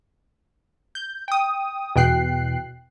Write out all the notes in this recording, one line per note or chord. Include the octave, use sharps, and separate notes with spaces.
G6
G5 D#6
E2 B2 G5 F#6 C7